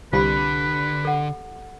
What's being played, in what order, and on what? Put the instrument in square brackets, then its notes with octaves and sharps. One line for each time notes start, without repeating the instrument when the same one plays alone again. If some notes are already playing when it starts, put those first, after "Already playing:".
[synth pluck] C2 [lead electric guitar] D3 [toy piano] F4 G4 B5 [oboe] B4
[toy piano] A4 F#5